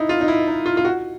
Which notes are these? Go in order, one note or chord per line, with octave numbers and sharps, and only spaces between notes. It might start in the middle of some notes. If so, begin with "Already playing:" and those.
Already playing: D#4 E4
F4
D#4
E4
D#4
F4
F4
F#4